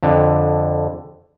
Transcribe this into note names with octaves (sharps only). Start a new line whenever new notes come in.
F2 D3